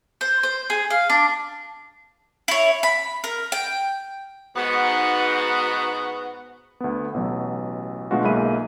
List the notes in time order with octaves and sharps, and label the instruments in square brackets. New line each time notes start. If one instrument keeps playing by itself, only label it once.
[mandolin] C5
C5
G#4
F5
D4
E4 C#5
B5
A#4
G5
[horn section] G#2 B3 F#4
[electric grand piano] D2 B3
A1 B2 F#3
B2 D3 G#3 A3 F4 F#4
B1 G#3 A#3 E5 B5 D#7